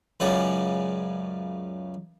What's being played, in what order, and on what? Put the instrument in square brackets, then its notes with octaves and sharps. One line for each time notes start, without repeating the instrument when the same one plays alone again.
[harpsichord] C#2 F#2 C#3 B3 C#4 D5